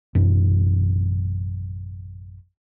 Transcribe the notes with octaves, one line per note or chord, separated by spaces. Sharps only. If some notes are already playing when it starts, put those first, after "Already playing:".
A1 F#2 B2 E3